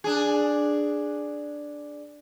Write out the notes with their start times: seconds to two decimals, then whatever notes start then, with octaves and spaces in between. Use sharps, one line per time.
0.04 D4 G#4